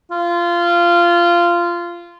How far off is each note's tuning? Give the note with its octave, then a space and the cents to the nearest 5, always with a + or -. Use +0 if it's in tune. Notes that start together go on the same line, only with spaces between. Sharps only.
F4 -15